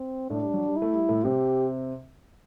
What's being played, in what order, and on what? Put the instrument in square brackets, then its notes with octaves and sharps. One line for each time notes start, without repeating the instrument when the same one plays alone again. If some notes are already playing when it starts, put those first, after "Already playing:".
Already playing: [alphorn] C4
[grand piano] A2 A3 [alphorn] D4
[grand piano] G3
F#3
G3
[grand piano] A3 [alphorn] E4
[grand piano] G3
A2 A3
[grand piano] C3 C4 [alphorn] G4